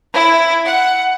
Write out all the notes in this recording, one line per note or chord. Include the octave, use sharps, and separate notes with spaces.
E4
F#5